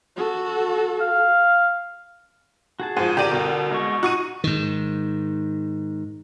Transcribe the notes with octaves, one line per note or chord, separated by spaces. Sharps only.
F#4 A4
F5
F#4 G#4 A5
G#2 F3
D3 G4 A#4 D5 D#7
C2 B2
G#3 D#5 C#6
D#4 F#4 C#6 D#7
G#2 D#3